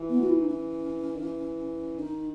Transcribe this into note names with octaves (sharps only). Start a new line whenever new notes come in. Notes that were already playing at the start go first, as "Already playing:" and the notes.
Already playing: E3
B3
F#4
E4
D#4
E3 C#4
D#3
E3
D#3 D#4